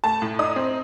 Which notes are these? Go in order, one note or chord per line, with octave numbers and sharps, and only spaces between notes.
A3 A5
A2
D#4 D#6
C4